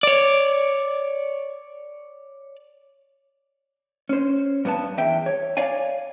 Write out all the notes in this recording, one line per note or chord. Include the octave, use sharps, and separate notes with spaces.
C#5 D5
C#4 C5
G2 B3 A5
E2 E5 G5
C#5
C#5 D5 F5 G#5